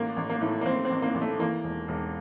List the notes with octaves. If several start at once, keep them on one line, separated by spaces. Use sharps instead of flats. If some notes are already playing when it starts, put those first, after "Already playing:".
Already playing: A1 A#3
A1
A#3
A2
A#3
A1 C4
C4
A1
A#3
A1
A3
E3 A#3
E1
E1